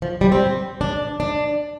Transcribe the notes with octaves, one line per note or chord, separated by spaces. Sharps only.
F3
G3
C4
D4
D4